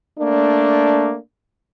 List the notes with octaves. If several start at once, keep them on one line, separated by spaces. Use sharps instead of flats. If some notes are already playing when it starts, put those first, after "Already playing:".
A3 A#3 D4